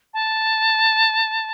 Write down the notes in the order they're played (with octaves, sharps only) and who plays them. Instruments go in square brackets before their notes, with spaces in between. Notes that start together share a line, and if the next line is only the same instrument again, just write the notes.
[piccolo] A5